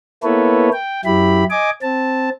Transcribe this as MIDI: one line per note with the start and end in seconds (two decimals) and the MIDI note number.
0.23 0.69 58
0.23 0.69 59
0.23 0.69 64
0.23 0.69 69
0.23 0.69 71
0.23 0.69 73
0.73 1.01 79
1.05 1.44 42
1.05 1.44 54
1.05 1.44 64
1.05 1.44 67
1.05 1.44 83
1.50 1.70 75
1.50 1.70 80
1.50 1.70 86
1.82 2.30 60
1.82 2.30 81